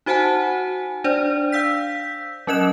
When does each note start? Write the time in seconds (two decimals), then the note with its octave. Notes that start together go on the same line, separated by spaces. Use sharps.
0.06 D#4 F#4 C5 F#5 G#5 A5
1.04 D4 C5 D5
1.52 F5 E6 G6 B6
2.47 F#3 C#4 A#4 D#5 F#6 E7